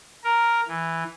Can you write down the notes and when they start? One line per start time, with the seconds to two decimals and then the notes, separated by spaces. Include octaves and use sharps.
0.24 A#4
0.68 E3